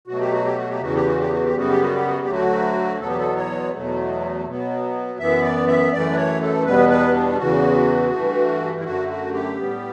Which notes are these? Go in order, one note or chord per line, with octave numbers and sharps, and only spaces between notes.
B2 F#3 A3 F#4
G4
F#4
G4
F#4
G4
E2 C#3 E3 F#4
G4
F#4
G4
F#4
G4
F#2 C#3 G3 B3 F#4
G4
F#4
G4
F#4
G4
D2 D3 F#3 A3 F#4
E2 B2 F#3 B3 A4
G4
A4
C#5
E2 B2 F#3 A3
B2 F#3 B3
F#2 E3 B3 E5
D5
E5
F#2 E3 A3 D5
B4
C#5
A4
E2 B2 G3 B3 B4
B4
D4
E2 C#3 E3 F#4
G2 E3 A3
E4
F#2 D3 A3 F#4
F#4
G4
A2 G3 B3